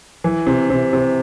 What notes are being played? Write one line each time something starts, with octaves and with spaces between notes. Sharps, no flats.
E3
C3
C3
C3